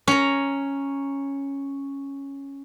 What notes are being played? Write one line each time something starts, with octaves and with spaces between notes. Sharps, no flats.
C#4 A#5